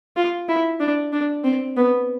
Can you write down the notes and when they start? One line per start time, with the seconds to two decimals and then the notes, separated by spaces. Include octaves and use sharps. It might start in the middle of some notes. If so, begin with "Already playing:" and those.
0.17 F4
0.49 E4
0.80 D4
1.13 D4
1.44 C4
1.77 B3